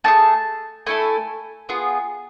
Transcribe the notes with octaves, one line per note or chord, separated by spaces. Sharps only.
A3 D4 G#4 A5
A3 E4 A4 G#5
B3 F4 G#4